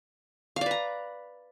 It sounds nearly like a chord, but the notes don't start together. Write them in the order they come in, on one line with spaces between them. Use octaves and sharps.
F5 D5 B4 A#5